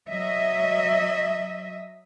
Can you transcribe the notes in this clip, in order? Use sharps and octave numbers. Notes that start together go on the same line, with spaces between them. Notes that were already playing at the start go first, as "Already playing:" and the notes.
F#3 D#5 E5